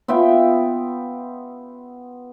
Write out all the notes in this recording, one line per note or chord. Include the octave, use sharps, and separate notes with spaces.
B3 F4 E5 G5